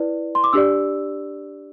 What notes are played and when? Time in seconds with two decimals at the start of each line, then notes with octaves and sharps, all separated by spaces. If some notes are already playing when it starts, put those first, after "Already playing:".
Already playing: E4 B4 D5
0.35 C6
0.44 D6
0.53 D4 G4 D5 E6